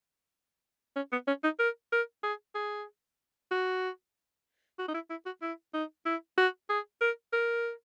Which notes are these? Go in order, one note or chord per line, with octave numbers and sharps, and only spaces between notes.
C#4
B3
C#4
D#4
A#4
A#4
G#4
G#4
F#4
F#4
D#4
E4
E4
F#4
E4
D#4
E4
F#4
G#4
A#4
A#4